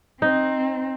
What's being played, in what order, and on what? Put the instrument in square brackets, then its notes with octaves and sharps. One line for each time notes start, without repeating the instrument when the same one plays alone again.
[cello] C4 [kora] D#4